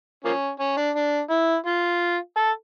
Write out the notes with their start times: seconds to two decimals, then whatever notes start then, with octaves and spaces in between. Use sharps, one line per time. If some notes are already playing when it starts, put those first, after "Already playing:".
0.25 F3 A#3 C#4
0.60 C#4
0.77 D4
0.96 D4
1.30 E4
1.67 F4
2.37 A4